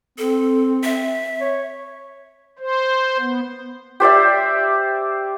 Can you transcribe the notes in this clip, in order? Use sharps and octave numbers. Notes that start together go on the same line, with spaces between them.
C4 A4
E5
C#5
C5
B3
G4 C5 D5 E5